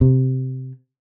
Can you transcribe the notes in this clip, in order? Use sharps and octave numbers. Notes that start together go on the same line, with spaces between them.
C3